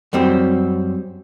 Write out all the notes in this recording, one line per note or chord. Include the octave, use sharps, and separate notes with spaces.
F#2 G3 C4